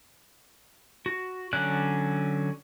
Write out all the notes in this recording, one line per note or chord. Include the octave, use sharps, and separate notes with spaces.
F#4
D3 F#3 C#4 D5 F#6